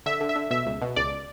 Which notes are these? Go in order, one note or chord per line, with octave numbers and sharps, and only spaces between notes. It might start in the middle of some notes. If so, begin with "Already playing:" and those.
D3 E5
D3
E5
D3
B2 E5
C#2
B2
C#2 D5